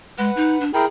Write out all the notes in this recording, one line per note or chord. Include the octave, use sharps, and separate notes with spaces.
G#3 B4 F#5
D#4
D4
E4 G#4 A#4 G5